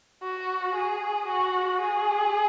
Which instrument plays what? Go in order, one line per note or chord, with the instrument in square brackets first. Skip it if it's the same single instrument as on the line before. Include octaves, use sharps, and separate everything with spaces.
[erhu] F#4
G#4
F#4
G#4